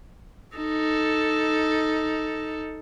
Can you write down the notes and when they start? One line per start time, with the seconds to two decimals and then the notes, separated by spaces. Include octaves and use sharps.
0.56 D#4 A4